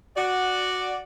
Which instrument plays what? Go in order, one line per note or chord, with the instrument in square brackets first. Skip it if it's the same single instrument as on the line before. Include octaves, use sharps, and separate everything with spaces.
[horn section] F#4 D5